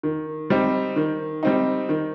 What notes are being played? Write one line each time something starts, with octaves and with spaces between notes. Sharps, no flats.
D#3
G3 C4 D#4
D#3
G3 C4 D#4
D#3